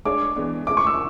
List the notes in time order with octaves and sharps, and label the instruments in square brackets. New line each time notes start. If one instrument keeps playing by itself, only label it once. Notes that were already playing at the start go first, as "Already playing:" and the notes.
[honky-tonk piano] G#3 D4 G#4 C#5 [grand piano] D6
[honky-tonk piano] E3 G#3 B3 D4
[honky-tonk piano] G#3 C#4 E4 [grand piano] D6
[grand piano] C#6
E6